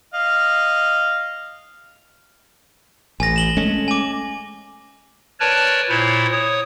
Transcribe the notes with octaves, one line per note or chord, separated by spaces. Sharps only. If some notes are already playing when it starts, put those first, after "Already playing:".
D#5 F5
A1 G#5 A#6
E7 F#7 G7
G#3 A3 C#4
G#5 D6
A#4 B4 C#5 D5 A5
A#2 E4 C5 C#5
C#5 D#6